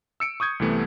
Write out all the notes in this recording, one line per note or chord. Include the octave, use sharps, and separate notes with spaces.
E6 C#7 D7
C#6 D#6 G6 G#6
C2 C3 E3 A3 B3